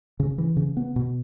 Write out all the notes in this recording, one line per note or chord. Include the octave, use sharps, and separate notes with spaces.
C#3
E3
C#3
B3
B2